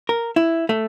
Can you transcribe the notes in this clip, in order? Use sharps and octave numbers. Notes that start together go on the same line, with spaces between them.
A#4
E4
A3